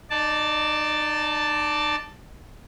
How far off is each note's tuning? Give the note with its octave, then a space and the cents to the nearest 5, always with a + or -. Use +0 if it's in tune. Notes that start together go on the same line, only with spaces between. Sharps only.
D#4 -30 D5 +0 A5 +0